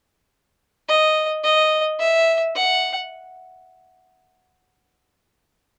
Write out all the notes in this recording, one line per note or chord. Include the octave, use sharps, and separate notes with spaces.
D#5
D#5
E5
F#5